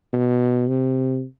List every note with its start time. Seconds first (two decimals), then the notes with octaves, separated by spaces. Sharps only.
0.13 B2
0.68 C3